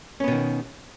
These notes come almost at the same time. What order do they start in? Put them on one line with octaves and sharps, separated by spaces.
C#4 B3 B2 D#3